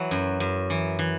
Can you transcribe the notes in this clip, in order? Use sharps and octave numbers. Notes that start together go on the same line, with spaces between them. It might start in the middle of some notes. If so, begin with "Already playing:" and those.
Already playing: E3 F#3
F#2
F#2
E3
E3